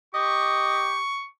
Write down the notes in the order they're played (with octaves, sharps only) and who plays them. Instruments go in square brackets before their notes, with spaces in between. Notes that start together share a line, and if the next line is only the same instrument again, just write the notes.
[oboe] G4 [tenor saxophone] D#5 [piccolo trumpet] C#6